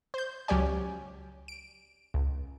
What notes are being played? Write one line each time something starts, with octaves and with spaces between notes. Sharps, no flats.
C5 G6
C#2 F#3 C#4 G4 D5 G#5
D7
C#2